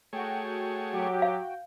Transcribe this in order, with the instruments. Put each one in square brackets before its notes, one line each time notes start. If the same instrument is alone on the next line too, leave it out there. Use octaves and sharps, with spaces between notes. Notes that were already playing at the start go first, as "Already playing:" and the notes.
[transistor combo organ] A3 G#4 C#5 [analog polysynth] F#4 G5
[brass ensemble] F#3 G4
[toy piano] F5